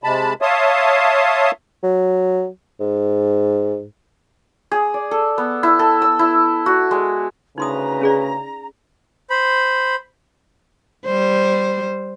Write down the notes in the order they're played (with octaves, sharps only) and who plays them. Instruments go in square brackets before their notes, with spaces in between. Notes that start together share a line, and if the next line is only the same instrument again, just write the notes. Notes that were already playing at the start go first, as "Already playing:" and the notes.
[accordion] C3 G#3 A5 B5
C#5 E5 F5 A5 C6 D#6
[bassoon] F#3
G#2
[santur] G#4
D5
A4
B3
E4
A4
E6
E4
F#4
G#3
[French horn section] D2 B4 [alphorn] C#3 [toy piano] D#4 C6 D#6 [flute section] A#5
[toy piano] C#4 G#4 D5
[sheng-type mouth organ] C5 B5
[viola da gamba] G3 C5